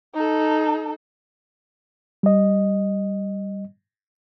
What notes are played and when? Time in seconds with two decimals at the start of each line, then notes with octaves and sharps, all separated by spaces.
0.14 D#4 A4
2.23 G3 D#5